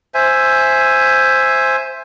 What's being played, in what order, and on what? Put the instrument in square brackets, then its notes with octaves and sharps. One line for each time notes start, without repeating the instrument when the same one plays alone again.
[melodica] C5 E5 G#5